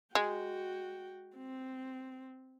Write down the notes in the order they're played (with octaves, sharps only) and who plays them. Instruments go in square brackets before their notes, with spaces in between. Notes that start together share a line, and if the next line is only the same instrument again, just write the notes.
[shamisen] G#3 [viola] F#4 G5
[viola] C4